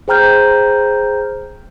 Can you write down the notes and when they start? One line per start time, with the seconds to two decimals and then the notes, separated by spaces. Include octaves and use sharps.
0.08 G#4 C5 G5 A#5 F6 G6